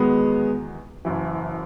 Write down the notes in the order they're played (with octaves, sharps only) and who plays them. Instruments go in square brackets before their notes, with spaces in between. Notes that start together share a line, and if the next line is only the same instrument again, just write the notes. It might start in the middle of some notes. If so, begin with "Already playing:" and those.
Already playing: [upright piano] E2 D#3 F#3 [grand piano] G#3 B3
[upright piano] F#1 F#2 E3